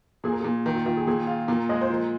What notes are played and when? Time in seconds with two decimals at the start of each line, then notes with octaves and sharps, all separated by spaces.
0.24 A#2 G#4
0.32 A#4
0.40 A#2 G#4
0.66 D#3 A#4
0.75 F4
0.86 D#3 F4
0.97 G#4
1.07 A#2 G#4
1.27 F4
1.48 A#2 A#4
1.69 G#3 D#5
1.81 C5
1.90 F3 A#4